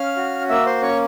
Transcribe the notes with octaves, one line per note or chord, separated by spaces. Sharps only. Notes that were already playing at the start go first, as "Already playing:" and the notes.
Already playing: C#4 F5 F6
F#4
A#3 E5 E6
C5 C6
C#4 C#5 C#6